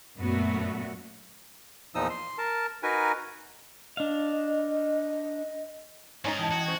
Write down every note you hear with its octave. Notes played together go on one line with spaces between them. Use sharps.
F#2 A#2 A3 B3 F#4
E2 A#2 F3 D#4 D#6 E6
C6
A#4 A5
D#4 F#4 A#4 B4 G#5
D4 D#5 F5
G#2 C#4 D#4 F4 G#4 A#5
E3 D#5 G5 A5 G#6
F#4
G#3 C#4 C5